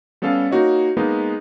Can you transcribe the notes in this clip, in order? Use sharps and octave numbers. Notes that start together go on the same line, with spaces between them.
G3 B3 C#4 A4 F5
A#3 D#4 F#4 C#5 D#5
G#3 A#3 B3 D#4 B4